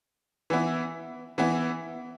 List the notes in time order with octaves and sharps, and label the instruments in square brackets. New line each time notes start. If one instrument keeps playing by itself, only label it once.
[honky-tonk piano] E3 B3 E4
E3 B3 E4